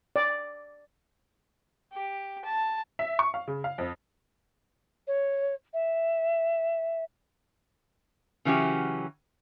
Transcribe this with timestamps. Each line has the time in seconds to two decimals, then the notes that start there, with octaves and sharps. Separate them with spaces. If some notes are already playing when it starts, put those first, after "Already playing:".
0.16 D5
1.93 G4
2.45 A5
2.99 E5
3.19 C#6
3.34 F5
3.48 C#3
3.64 F5
3.78 F2
5.07 C#5
5.73 E5
8.45 C#3 E3 F#3 C#4 G4